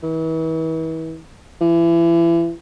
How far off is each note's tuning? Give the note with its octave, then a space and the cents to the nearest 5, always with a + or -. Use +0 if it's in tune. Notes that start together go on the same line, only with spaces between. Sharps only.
E3 -40
E3 +30